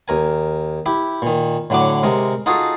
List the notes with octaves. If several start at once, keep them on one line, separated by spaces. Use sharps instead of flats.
D#2 A#4 G#5
E4 G4
A#2 D#3
A2 D3 F#3 F#5 D6
C3 G#3 A#4
D#4 F4 F#4 G#4 A4